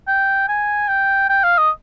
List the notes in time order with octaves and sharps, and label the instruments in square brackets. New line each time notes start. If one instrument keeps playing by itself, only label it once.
[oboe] G5
G#5
G5
G5
F5
D#5